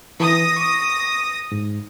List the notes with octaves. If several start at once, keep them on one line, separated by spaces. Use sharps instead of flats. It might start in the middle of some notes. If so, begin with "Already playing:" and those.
E3 D#6 A#6
C#6 D6
G#2